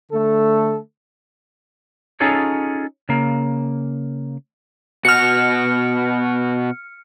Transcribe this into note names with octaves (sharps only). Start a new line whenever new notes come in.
D3 A3 A4
C#4 D#4 F4 G#4 A4 C#5
C#3 A#3
B2 F#4 F6 C#7